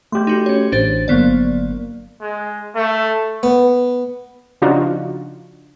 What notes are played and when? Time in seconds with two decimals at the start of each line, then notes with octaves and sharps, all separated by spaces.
0.12 A3 G4 C6 G6
0.27 D#4 F#4
0.46 C#4 C#5
0.72 A1 D4 C5 A6
1.08 G1 F#3 A#3 B3 D5
2.21 G#3
2.75 A3
3.43 B3
4.62 C#3 F3 D4 D#4 F4 F#4